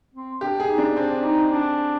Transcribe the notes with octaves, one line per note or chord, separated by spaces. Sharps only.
C4
D4 G4
G#4
D#4
D4
C4 D4
D4
D#4
D4